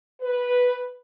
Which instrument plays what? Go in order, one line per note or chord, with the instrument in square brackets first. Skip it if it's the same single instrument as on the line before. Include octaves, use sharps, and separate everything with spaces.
[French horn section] B4